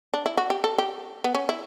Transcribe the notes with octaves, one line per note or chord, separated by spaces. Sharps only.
D4
E4
F#4
G4
A4
G4
B3
C#4
E4